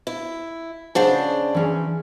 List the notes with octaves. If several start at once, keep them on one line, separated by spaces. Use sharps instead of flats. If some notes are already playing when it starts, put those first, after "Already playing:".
E4
C#3 D4 G#4 C5 D#5 F#5
E3 C#4 G#4